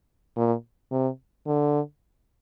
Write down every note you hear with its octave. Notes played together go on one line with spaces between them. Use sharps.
A#2
C3
D3